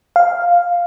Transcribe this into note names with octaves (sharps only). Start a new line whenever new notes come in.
F5